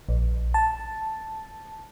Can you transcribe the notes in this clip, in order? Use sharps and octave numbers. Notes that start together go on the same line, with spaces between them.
A#1
A5